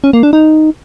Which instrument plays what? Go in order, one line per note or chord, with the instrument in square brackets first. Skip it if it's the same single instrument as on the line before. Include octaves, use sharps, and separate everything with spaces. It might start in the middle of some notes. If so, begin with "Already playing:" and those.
[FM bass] C#4
A#3
D4
D#4